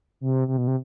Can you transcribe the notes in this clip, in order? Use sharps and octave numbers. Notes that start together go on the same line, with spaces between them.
C3
C3
B2
C3